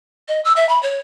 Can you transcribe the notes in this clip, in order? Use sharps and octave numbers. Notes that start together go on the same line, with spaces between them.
D#5
E6
E5
B5
C#5